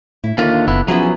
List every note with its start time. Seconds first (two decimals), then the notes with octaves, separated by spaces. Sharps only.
0.24 A2 E4
0.38 D#2 D3 A3 A#3 F4
0.68 F#1 B3 E4
0.88 F3 F#3 B3 C#4 E4 G#4